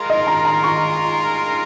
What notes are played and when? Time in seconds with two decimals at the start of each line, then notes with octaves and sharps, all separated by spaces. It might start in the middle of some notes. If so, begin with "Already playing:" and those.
Already playing: G#3 F4 A#4
0.10 D#5
0.27 A#5
0.45 A#5
0.64 C#6